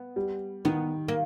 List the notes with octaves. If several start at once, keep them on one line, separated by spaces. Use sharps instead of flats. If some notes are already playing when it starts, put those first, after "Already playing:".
Already playing: B3
G3
D#3 B3
A#3